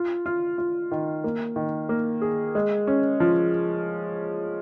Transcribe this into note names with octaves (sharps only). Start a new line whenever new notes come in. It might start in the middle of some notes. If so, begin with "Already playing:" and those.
Already playing: F4
F4
F4
D#3
A#3
D#3
A#3
G#4
G#3
C#4
F3